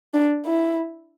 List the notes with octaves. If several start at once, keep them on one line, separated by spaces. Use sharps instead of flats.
D4
E4